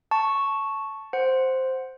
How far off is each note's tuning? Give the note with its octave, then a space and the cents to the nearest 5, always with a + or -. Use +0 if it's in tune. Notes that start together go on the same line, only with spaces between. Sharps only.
A5 +0 C#6 +0
C5 +0 F#5 +0